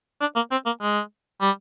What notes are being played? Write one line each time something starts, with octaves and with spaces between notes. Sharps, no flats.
D4
A#3
C4
A#3
G#3
G3